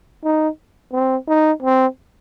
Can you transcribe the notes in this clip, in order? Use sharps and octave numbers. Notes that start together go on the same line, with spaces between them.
D#4
C4
D#4
C4